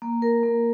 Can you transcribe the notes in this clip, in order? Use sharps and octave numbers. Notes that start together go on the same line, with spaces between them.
A#3
A#4
A#3